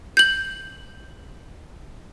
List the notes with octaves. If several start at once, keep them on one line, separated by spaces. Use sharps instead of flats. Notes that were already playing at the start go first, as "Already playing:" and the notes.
G6 F#7